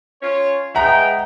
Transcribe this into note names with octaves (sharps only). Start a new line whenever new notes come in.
C#4 F4 C#5
G#3 B3 E5 F#5 G5 A#5